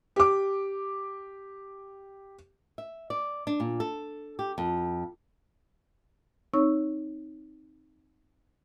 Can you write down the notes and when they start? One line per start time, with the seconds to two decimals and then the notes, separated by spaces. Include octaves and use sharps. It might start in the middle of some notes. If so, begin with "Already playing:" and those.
0.16 G4 D6
2.78 E5
3.10 D5
3.47 D4
3.60 A#2
3.80 A4
4.39 G4
4.58 F2
6.54 C4 D#4 C#5 C#6 E6